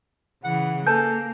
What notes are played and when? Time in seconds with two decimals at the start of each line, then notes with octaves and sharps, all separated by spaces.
0.44 C#3 E3 F#5
0.87 A#3 A4 B4 G#5 A5 G6